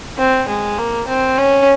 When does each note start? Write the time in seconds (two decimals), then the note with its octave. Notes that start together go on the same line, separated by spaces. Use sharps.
0.18 C4
0.48 G#3
0.78 A#3
1.07 C4
1.38 C#4